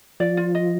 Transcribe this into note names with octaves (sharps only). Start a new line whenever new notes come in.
F3 D5
F4
D#5